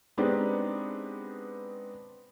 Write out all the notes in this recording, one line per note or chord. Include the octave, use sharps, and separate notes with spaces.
G#3 B3 C4 D4 D#4 G4